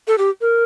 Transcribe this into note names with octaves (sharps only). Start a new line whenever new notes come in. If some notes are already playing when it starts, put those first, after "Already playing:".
A4
G4
A#4